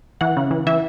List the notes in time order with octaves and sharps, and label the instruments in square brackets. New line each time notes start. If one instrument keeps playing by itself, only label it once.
[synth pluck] E3 F#5
C#3
E3
E3 E5